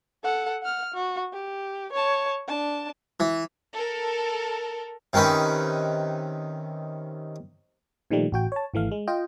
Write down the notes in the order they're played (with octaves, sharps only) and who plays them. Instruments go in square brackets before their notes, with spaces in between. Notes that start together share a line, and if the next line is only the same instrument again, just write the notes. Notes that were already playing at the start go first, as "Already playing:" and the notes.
[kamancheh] A4 F#5
F#5 F6
F#4
G4
C#5 A5
D4 A5
[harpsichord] E3
[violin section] A4 A#4
[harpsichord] C3 D#3 C#4 D#4 B4
[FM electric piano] A#2 D#3 F3 G3 A3
A1 F#4 G5
C#5 A5
G#1 E3 A3 F5
G#3
F4 D#5 G5